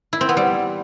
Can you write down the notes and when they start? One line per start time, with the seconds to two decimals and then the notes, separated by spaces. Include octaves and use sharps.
0.13 E4
0.21 C4
0.29 B3
0.37 G3